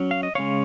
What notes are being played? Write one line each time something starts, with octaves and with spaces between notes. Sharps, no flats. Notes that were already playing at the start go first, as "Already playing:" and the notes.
Already playing: F#3 C#4
F5
D#5
C#3 G#3 C#4 C#5 F5